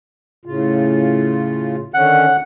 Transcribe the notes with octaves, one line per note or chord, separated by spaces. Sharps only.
A2 C#3 F4
D3 D#3 C#4 F#5